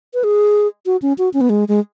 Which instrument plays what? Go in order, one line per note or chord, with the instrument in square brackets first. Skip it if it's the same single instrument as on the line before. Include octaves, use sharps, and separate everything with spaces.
[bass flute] B4
G#4
F#4
C#4
F#4
C#4
B3
G#3
G#3